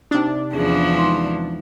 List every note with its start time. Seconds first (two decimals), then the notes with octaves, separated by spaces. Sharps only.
0.11 C3 D4 D#4
0.53 E2 E3 F3 C#4 G#4
0.94 G#3 D#4 C6